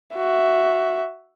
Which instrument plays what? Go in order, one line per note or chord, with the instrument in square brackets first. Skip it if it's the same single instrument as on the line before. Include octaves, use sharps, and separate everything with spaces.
[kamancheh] F#4 E5